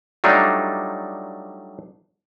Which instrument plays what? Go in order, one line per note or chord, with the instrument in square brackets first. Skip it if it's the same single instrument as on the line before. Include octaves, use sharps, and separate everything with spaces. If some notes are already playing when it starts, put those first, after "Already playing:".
[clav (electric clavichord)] F#3 G3 A3 D4 D#4 F4